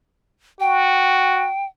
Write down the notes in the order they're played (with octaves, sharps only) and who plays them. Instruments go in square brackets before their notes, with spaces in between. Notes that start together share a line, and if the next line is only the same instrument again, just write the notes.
[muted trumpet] F#4 [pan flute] G5